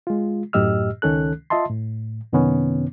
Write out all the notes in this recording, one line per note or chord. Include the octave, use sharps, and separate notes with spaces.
G#3 F4
F#2 A2 G4 D#5 E6 F6
C#2 D#3 C#4 A4 F#6
F4 D#5 E5 A5 C6
A2
F#2 C3 D#3 B3 C#4